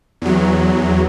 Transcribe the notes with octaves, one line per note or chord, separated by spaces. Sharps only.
E2 F#3